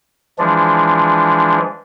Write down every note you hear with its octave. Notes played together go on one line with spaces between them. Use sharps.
E3 F3 G#3 D4